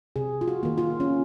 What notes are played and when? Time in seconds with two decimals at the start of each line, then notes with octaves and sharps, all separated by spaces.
0.16 C3 G#4
0.41 F4
0.48 F#4
0.63 D#3 A#3
0.78 F4
1.00 C#4